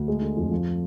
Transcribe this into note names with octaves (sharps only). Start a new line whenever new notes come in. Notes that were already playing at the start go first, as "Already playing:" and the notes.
Already playing: D2
G#3
D3
F2
F3